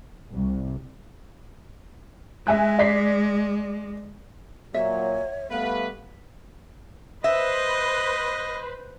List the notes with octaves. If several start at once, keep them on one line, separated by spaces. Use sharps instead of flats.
C2
G#3 E5 G#5 F#6
D5 B6 C7
A#2 F#3 C#5 E5
G3 A3 B3 B4 F5
B4 C5 D#5 E5